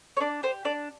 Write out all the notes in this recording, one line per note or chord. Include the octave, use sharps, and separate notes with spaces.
C#5
D4 D5
G4 C5
D4 D5